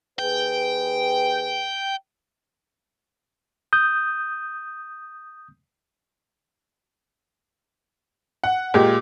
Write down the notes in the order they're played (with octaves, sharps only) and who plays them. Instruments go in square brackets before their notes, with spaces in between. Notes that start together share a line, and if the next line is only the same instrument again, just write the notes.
[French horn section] D#2 G#4 B4 [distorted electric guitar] G5
[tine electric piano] D#6 G6
[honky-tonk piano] F#5
A#2 G#3 G4